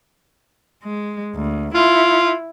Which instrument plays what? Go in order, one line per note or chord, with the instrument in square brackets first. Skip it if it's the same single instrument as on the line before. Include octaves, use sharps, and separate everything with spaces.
[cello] G#3
D2
[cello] E4 [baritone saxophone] F4